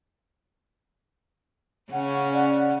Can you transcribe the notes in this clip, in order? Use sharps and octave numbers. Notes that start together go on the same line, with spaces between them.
C#3 C#4 F#5
D5 F#5